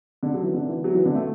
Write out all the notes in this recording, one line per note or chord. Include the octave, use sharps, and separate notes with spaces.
D3
F#3
E3
D3
E3
F#3
E3
D3
A3